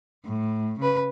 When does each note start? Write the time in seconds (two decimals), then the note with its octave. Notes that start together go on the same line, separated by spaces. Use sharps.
0.25 A2
0.79 C#3 B4